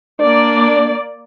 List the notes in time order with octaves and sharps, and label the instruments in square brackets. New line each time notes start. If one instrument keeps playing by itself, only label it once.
[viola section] A#3 D5 [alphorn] D4